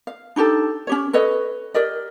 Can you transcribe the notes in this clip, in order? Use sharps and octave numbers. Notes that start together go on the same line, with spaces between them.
F5
D4 D#4 G4 A4
C#4 G4 C#5
A4 B4 C#5 D#5
G4 A#4 D5 D#5